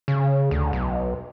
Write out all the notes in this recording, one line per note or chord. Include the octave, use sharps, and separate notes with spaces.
C#3
D2
B1